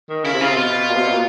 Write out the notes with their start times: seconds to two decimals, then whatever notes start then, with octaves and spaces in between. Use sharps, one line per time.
0.09 D#3
0.24 C#3 E4
0.33 C3
0.41 C#3 F4
0.49 C3
0.57 B2 F4
0.89 A#2
0.96 C3
1.00 B2
1.11 A#2